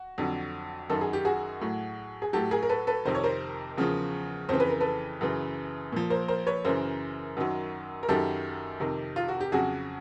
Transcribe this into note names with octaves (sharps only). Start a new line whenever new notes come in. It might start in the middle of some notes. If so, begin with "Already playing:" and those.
Already playing: F#4
F2 D3 F#3
F#2 D#3 F#3 A4
G#4
G4
F#4 G#4
A2 F#3
G#4
A2 F#3 G4 A4
G#4 A#4
A#4
A4 B4
A4 B4
F2 C3 D#3 C5
C#5
A#4 C5
E2 C#3 F3
F2 C#3 E3 C5
B4
A#4
A4 B4
F#2 C#3 E3
A#2 F3
A#4 C5
A#4 C5
B4 C#5
F#2 C#3 E3 A#4 C5
F#2 D#3 F#3
A#4
F#2 D#3 F#3 G4 A4
F2 C3 D#3
F4
F#4
G4
F2 C#3 F#3 F#4 G#4